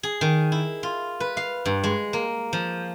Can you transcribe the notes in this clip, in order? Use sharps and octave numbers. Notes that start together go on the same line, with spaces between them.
G#4
D#3
E4
F4
B4
F5
G2
G#3
A#3
F3